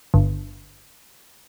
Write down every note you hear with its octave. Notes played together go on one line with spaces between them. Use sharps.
G1